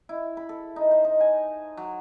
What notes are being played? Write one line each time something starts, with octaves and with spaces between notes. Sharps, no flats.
E4
B5
A4
D#4
C5
D#4
G#5
F#3